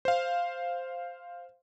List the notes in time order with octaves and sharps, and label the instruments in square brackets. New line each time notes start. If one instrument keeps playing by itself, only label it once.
[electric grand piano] C5 F5